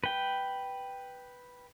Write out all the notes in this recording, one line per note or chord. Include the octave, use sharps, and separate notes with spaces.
B4 G5